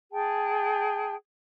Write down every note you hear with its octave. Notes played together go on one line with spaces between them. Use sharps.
G#4 G5 A5